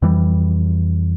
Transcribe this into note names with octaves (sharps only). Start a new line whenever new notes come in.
F2 E3 G3